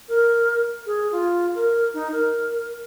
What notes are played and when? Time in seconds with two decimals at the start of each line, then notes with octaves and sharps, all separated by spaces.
0.09 A#4
0.86 G#4
1.12 F4
1.55 A#4
1.94 D#4
2.12 A#4